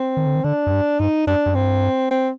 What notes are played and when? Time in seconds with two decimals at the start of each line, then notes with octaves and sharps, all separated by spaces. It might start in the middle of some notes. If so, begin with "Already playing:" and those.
Already playing: C4
0.17 D#3
0.26 D3
0.35 D#3
0.44 D3 D4
0.66 F#2
0.72 G2
1.00 G2 D#4
1.27 F#2 D4
1.46 F#2
1.55 G2 C4
2.11 C4